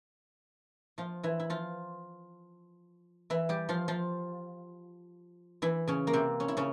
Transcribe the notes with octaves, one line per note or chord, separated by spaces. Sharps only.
F3 F4
E3 E4
E4
F3 F4
E3 E4
G3 G4
F3 F4
F3 F4
E3 E4
C#3 C#4
A#3
C3 C4
C#4
E4
C#3 C#4